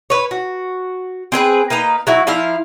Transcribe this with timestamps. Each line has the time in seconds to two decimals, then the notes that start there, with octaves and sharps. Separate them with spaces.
0.10 B4 C#5
0.31 F#4
1.32 C4 G#4 A#4 B4
1.70 A#3 D#4 B4 A#5
2.07 F#3 E4 F#4
2.27 F3 E4 F5 A#5